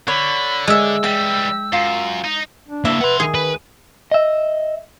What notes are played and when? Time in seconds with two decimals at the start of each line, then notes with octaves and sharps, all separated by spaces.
0.08 D3 C#5 B5
0.67 G#3 E5 E6
1.04 E3 G3 G5
1.73 F#2 F4
2.25 D#4
2.68 D4
2.85 A#3 E4 E5
3.01 B4 F#5 C6
3.20 D#3 G#4
3.34 B4
4.12 D#5 E5